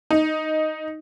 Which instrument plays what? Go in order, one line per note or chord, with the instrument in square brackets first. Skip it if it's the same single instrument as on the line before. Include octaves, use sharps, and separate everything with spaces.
[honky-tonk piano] D#4